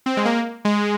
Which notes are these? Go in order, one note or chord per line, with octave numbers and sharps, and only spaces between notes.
C4
G#3
A#3
G#3